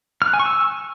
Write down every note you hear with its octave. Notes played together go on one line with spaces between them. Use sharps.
F6
F#6
G#5
C#6
E6